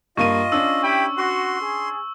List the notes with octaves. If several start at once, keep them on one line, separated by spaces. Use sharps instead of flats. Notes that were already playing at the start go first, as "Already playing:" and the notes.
G2 A#3 F4 D#5 C#6 D#7
C#4 D4 E6
E4 G4 G5 B5
F#4 C6
G#4